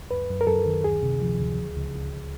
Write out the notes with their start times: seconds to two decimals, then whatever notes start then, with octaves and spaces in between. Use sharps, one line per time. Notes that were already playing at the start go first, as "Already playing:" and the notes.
Already playing: C#2
0.11 F#2 B4
0.30 F#2
0.41 A#4
0.47 F#2 A4
0.66 D#3
0.84 D2 G#4
1.03 C3
1.22 F3
1.40 D2
1.58 C#2
1.77 C#2
1.95 C#2